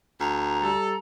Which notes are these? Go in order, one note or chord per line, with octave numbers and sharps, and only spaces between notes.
D2 A#5
G3 A4